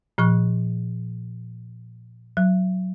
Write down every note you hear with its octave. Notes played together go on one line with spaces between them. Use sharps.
A#2 F3 C#6 F#6
F#3